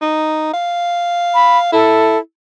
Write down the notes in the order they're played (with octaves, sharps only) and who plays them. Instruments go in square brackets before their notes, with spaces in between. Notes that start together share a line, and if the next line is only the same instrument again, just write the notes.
[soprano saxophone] D#4
F5
[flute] B5
[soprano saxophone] E4 [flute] A4